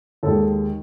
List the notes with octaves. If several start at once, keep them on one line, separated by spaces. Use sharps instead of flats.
D#2 D#3 G#3 A4